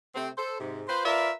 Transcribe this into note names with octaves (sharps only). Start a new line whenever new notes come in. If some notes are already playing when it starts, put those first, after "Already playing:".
C3 A3 C4
A4 C5
G#2 C3
F4 B4 C5
F4 A#4 B4 D5 E5